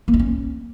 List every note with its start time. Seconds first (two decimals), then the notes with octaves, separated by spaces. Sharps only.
0.08 A#3
0.14 D4
0.20 C#4